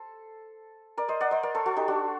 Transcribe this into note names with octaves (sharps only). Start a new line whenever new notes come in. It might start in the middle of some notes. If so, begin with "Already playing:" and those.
Already playing: A4 C5
A#4 D5
C5 D#5
D5 F#5
C5 D#5
A#4 D5
A4 C5
F#4 A4
D#4 G4
D4 F#4